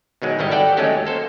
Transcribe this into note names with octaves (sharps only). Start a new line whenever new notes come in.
B2 D#3 F#3 G#3
G#1 D#3 G3 E4 D#5
G4 A4 D5 F#5 G5
D#2 F#3 G#3 A3 C#4 G4
A#3 A4 C5